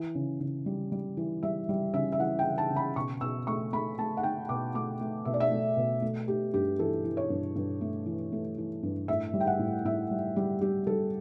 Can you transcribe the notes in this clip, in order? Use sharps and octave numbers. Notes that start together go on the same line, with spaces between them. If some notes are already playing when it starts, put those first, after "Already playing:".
Already playing: E3
C#3
C#3
G3
G3
E3
G3 E5
G3
C#3 E5
E5
E3 F#5
G5
E3
A5
C#3
B5
B2 C#6
B2 E6
A3 C#6
A3 B5
A3 A5
F#5
A3 G5
B2 D6
A3 D6
A3
B2 E5
D5
E5
A3
B2
A3
A3 G4
G2 G4
E3 A4
E3
C#5
G2
G2
A3
E3
A3
E3
G2
A2 E5
G3
G5
F#5
A2
A2 E5
G3
G3 G4
G3 G4
G3 A4